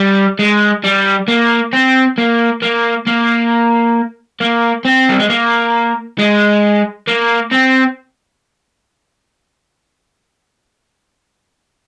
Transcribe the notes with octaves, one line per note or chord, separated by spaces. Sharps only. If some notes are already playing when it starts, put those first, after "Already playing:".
Already playing: G3
G#3
G3
A#3
C4
A#3
A#3
A#3
A#3
C4
G3
G#3
A#3
G#3
A#3
C4